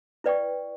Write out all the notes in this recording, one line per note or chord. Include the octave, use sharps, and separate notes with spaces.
E4 B4 D5 G5 C#6